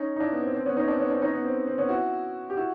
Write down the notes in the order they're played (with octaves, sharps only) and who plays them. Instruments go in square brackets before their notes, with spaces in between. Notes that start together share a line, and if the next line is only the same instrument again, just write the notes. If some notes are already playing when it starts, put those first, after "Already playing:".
Already playing: [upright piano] C#4 D#4
D#4
D4 E4
B3
C4
C4
B3 C#4
C#4 D#4
C4 D4
B3 C#4
C4 D4
C#4 D#4
B3
C4
C4
B3 C#4
E4 F#4
G4
E4 F#4